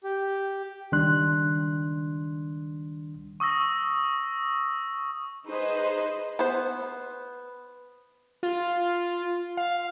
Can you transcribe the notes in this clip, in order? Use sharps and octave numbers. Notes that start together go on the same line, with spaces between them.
G4
C#2 D#3 G3 D4 C6 F#6
C#6 D#6 E6 A#6
D#4 G#4 B4 C5 D#5
B3 C5
F4
F5